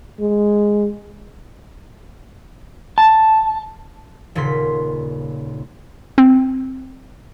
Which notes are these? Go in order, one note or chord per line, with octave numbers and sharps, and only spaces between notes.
G#3
A5
D#1 A#2 C#3 C6 B6
C4